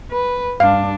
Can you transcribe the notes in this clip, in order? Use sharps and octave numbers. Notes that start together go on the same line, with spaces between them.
B4
G2 D4 F5